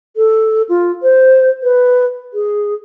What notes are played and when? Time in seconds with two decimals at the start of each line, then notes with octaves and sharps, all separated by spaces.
0.16 A4
0.69 F4
1.03 C5
1.63 B4
2.34 G#4